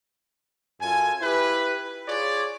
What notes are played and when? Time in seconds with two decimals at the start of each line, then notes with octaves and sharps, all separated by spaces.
0.81 F#2 F4 A4 G#5
1.22 E4 G4 B4
2.07 F4 G#4 C#5 D5